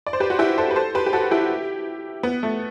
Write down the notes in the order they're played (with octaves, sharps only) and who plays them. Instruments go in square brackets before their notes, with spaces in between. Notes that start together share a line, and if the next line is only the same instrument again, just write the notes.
[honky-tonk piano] D5
C5
G4 B4
F#4
E4 G4
A4 C5
B4
A4 C5
G4 B4
G4
F#4 A4
E4 G4
B3
A3